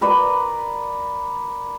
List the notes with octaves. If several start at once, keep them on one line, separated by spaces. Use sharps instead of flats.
A#4 B4 D5